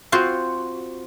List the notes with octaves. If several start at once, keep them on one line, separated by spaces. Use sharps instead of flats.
C4 F4 F#4 C5